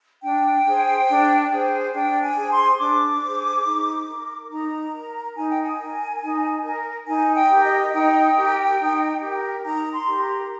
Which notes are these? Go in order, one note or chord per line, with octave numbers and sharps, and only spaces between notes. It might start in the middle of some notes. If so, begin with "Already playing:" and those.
D4 G5
G#4 C5
D4
G#4 C5
D4 G5
G#5
G#4 C5
C6
D4 D6
G#4 C5
D#4
A#4
D#4 A#5
A#4
D#4 G#5
G5
G#5
A#4
D#4
A#4
D#4 G#5
G5
G4 A#4
D#5
D#4 G5
G4 A#4
D#4
G4 A#4
D#4 A#5
C6
G4 A#4
A#5